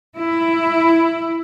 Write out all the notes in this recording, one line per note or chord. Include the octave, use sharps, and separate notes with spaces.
E4